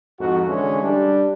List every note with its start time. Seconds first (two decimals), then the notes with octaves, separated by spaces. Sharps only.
0.19 F2 G#2 F#4
0.48 D3 E3 G#3 C#4
0.83 G3 D4